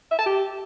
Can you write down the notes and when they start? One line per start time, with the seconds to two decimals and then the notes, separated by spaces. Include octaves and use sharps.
0.11 E5
0.19 A5
0.26 G4